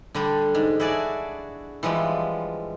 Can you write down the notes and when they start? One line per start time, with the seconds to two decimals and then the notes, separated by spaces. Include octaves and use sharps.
0.14 D3 G3 D4
0.55 G#2
0.80 E4 F#4 G#4 D5 G#5 A5
1.83 E3 F3 G3 G#3